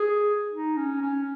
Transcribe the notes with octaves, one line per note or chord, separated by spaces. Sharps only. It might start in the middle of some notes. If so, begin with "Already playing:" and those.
Already playing: G#4
D#4
C#4
C#4